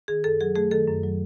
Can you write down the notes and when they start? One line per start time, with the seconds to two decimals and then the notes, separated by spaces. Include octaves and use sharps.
0.08 D#3 G#4
0.24 F#2 A4
0.41 F#3 G#4
0.56 A3 G#4
0.71 D#3 A4
0.88 F#2
1.03 F#3